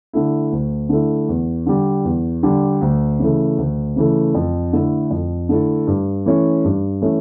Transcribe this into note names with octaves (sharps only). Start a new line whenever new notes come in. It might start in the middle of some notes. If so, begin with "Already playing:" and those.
D3 A3 E4
D2
D3 A3 E4
E2
D3 G3
E2
D3 G3
D2
C#3 E3 A3
D2
C#3 E3 A3
F2
D3 A3 E4 A4
F2
D3 A3 E4 A4
G2
E3 A3 C#4
G2
E3 A3 C#4